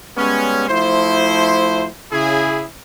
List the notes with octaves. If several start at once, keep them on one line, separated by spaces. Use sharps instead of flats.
G3 G#3 B3 C#4
F3 A3 E4 C5
C#3 E4 G#4